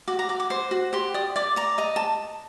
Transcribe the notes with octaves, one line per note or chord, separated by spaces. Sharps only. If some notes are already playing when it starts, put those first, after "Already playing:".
F#4 D6
A#5
F#4 D6
D6
C5
F#4
G4 C6
D5 D#6
D5 D6
D5 A#5
D#5 A#5
A5